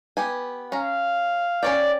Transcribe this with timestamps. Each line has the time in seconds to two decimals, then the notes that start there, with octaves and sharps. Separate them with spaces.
0.17 B3 G4 G#5
0.72 C#4 F5 A#5
1.63 C#4 C#5 D5 G5